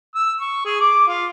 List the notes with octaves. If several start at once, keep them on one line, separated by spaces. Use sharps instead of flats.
E6
C#6
G#4
D6
F4